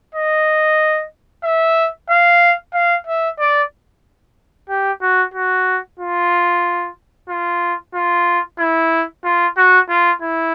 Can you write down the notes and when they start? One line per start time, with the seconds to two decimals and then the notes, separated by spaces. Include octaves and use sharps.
0.15 D#5
1.44 E5
2.10 F5
2.74 F5
3.07 E5
3.39 D5
4.69 G4
5.01 F#4
5.34 F#4
5.99 F4
7.29 F4
7.94 F4
8.59 E4
9.24 F4
9.57 F#4
9.89 F4
10.22 E4